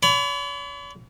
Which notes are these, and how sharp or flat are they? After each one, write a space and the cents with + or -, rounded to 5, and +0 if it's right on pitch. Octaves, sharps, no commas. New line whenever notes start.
C#5 +45 B5 +35